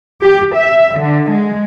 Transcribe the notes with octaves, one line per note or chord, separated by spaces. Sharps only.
G4
E5
D3
G#3